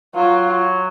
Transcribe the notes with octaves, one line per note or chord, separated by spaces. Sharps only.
F#3 F4